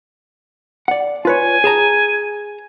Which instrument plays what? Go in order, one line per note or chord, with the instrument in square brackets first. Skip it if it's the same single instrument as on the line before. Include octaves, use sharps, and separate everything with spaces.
[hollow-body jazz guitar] D5 F#5
[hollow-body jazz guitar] F4 B4 C#5 [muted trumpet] G#5
[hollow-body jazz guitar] G#4 A5 A#5